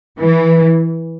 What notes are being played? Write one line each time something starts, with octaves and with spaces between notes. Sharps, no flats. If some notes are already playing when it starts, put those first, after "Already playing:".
E3